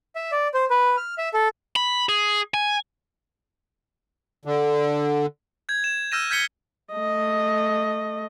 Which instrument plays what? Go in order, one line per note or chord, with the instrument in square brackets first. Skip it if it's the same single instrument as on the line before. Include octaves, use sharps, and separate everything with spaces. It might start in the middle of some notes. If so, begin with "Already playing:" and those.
[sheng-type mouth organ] E5
D5
C5
B4
F6
E5
A4
[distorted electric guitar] B5
G#4
G#5
[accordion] D3
[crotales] G6 G#6
E7
E6 F6 G6 A#6 D#7 E7
F6 G6 G#6 B6 C#7 G7
[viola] A3 D#5